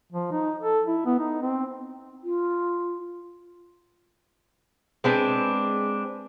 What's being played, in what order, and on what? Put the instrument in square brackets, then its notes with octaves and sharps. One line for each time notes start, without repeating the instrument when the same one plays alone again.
[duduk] F3
D#4
A4
E4
B3
D#4
C4
[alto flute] F4
[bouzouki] G#3 C4 D4 B4